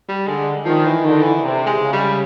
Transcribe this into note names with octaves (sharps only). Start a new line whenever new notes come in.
G3
D3 G#3
D#3 F3
E3
D3 D#3
E3
C3
G#3
C#3
G3